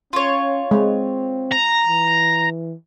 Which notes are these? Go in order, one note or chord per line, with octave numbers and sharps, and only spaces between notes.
C#4 F4 C#5
G#3 C4
A#5
E3